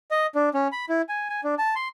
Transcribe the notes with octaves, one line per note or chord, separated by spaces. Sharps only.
D#5
D4
C#4
B5
E4
G#5
G#5
D4
A5
C6